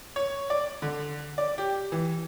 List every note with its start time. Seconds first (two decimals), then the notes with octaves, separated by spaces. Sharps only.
0.16 C#5
0.50 D5
0.82 D3
1.38 D5
1.58 G4
1.92 E3